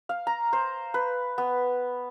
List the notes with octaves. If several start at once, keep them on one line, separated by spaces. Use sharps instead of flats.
F5
A#5
C5
B4
B3